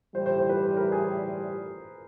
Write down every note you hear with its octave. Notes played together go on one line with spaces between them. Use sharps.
A2 E3 G3 C5
C5
C5
B4
A#4
G#4